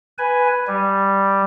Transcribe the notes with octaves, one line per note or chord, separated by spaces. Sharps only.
B4 G#5
G3